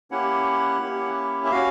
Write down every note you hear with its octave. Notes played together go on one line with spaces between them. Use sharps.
A#3 C#4 E4 G4 F#5
A#3 C#4 E4 G4
E5
C#4 F#4 F5